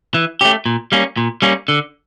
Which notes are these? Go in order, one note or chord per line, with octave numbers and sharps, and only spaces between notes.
E3
A3 C#4 G4
A#2
G3 A#3 C#4
A#2
G3 A#3 C#4
D3